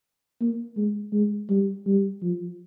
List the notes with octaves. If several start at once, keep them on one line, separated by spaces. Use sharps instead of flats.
A#3
G#3
G#3
G3
G3
F3